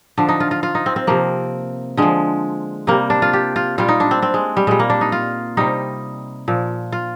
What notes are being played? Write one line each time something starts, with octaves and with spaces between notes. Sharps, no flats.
D3 F3 D4
D#4
F4
F4
F4
D#4
C4
C4
C3 F3 A#3
D3 F3 G#3
C3 G3 A#3
D4
F4
G4
F4
A#2 G3 F4
D#4
D4
C4
C4
G#3
G3
A#2 G3 G#3
A#3
D4
D#4
F4
C3 G3 D#4
A#2 F3
F4